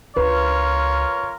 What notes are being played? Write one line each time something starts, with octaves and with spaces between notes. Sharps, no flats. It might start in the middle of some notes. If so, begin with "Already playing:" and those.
C#2 D4 F4 A#4 B4 C#5